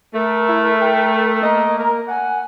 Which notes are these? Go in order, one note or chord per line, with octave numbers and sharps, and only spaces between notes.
A3 A#4
E4
G5
A#3 D#5
A#4
F#5 G#5